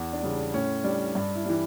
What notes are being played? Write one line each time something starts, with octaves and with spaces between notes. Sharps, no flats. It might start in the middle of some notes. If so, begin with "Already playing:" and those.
Already playing: E2
D4
C#3 G3
D4
A2 C#4
G3 D4
G2 D4
E4
E3 G3